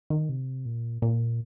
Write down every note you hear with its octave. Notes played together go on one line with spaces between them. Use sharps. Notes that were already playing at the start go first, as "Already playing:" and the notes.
D#3
C3
A#2
A#2